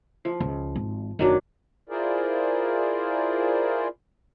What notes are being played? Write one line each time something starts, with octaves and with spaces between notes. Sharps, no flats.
F3
C#2
G#1
F#1 D#3 F#3 D4
E4 F4 G#4 A#4 C5 D5